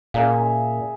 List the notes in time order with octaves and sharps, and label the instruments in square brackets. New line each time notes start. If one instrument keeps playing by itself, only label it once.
[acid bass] A#2 [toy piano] C#4 D5 F5 [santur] G#4 A#4 E5